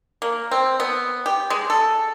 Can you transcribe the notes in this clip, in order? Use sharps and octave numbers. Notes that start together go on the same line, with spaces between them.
A#3
C4
B3
G4
G#3
A4